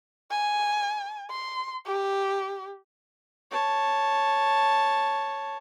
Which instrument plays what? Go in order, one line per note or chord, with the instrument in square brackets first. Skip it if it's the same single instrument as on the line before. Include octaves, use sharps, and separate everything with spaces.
[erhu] G#5
C6
G4
[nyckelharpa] C#5 A5